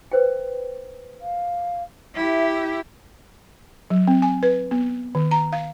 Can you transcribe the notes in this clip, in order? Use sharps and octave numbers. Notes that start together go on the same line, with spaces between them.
B4 C5 G5
F5
E4 G4 E5
F#3
C4
G#5
B4
B3
D#3
A#5
F5